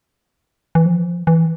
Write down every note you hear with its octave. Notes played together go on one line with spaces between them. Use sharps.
E3
F3
E3